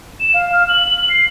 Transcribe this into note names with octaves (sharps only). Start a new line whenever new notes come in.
E7
F5
F6
F#7
F#7
C7